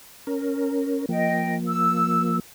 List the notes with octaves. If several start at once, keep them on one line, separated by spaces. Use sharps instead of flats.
C#4 A#4
F3 A#3 D#5 G5
E6